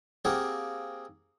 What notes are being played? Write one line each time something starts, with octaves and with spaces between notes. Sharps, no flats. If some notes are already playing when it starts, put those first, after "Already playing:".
A#3 C4 G4 G#4 F5 F#5